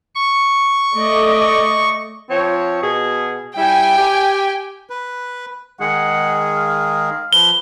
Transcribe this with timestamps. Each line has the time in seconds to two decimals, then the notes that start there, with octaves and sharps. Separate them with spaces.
0.15 C#6
0.95 A3 D5 D#5
2.30 F3 C4 C#5
2.82 B2 G#4
3.57 G3 E4 G5 G#5
3.97 G4
4.90 B4
5.80 D#3 G#3 G#4 F#5
6.56 F5
7.33 F3 B4 G7